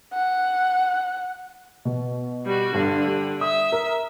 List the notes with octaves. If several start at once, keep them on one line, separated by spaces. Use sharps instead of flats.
F#5
B2
G3 F#4
G2 D3
G3
E5 D#6
A#4